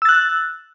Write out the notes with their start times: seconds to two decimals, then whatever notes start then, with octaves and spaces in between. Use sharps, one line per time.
0.02 E6
0.05 A6
0.09 F#6